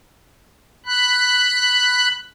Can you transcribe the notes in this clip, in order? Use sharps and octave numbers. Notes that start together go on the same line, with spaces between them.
B5 F#6